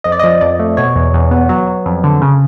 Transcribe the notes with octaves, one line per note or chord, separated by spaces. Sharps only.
F2 D#5
D5
D#5
F3
F2 D5
A3
B2 C#5
E2
E2
B3
F#3
F#3
F2
D3
C#3